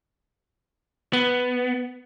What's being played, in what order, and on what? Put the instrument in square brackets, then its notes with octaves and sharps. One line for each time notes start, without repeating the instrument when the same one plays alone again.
[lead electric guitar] B3